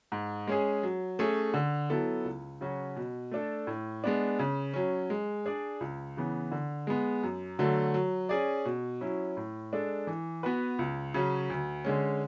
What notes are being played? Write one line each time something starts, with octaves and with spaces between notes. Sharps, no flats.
G#2
G#3 C#4 G#4
F#3
A3 C#4 G#4 C#5
D3
F#3 B3 E4 A4
C#2
C#3 F#3 C#4 F#4
B2
A3 D4 A4
A2
G#3 B3 D4
C#3
F#3 C#4
G#3
D4 G#4 D5
C#2
C#3 E3 B3
D3
G#3 B3
F#2
D3 F#3 A3
F#3
C#4 G#4 D5
B2
F#3 C#4 E4
A2
G#3 D4 A4
E3
B3 F#4 B4
C#2
C#3 F#3 C#4
D2
D3 G#3 C#4